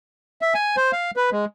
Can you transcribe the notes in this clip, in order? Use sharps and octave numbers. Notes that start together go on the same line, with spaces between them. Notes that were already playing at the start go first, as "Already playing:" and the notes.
E5
G#5
C5
F5
B4
G#3